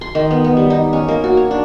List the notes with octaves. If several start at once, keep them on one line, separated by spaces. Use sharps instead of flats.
C6
D#3
B3
B3
G3
D#4
C#4
A#3
F#4
C#5
D4